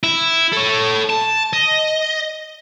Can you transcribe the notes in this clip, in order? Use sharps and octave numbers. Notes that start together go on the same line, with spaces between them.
E4
A4 C#5
A5
D#5